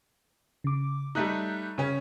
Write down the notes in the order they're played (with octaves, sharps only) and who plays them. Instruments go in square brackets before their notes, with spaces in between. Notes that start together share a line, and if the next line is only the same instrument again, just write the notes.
[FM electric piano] C#3 D6
[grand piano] G3 A3 D#4 [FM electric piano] A#5 F#6 G6
[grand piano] C#3 C#4